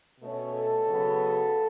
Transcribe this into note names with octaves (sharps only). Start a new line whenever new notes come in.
B2 A3 C#4
A4
C#3 F#3 B3